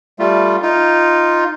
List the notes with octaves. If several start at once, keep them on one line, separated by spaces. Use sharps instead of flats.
G3 A3 F4
D#4 F4